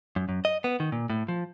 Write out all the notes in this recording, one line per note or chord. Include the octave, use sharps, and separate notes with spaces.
F#2
F#2
D#5
B3
D#3
A#2
A2
F3